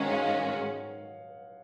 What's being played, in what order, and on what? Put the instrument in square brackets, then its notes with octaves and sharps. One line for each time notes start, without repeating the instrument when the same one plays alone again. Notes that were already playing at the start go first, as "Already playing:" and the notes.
Already playing: [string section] G#2 D#3 G#3 C#4 F#4 [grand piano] C#5 D#5 F5
[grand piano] F5
F#5